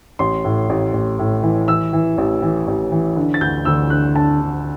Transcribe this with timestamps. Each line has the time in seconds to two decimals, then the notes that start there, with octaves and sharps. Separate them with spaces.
0.19 A1 C6
0.45 A2
0.69 A1
0.93 A1
1.19 A2
1.43 E3
1.68 E3 E6
1.93 E3
2.18 A1
2.42 E3
2.68 A1
2.92 E3
3.16 D3
3.34 A6
3.41 D2 G6
3.65 D2 E6
3.90 D3 F#6
4.15 D3 A5
4.40 D3